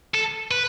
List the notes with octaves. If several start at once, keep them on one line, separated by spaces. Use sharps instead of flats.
A4
B4